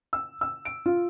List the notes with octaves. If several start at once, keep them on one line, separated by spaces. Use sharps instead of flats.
E6
E6
D7
F4